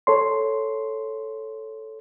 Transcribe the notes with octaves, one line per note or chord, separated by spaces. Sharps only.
A4 C#5 C6